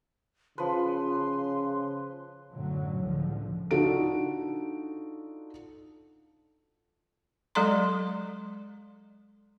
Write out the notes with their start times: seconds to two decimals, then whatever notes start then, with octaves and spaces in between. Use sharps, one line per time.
0.58 C#3 F3 B4 C6
2.53 F#2 A2 D3 F#3
3.00 C#2 A2 D3 F3
3.71 D4 D#4 F4 F#4 A4 D7
7.55 F#3 G#3 A4 D5 A#5 C6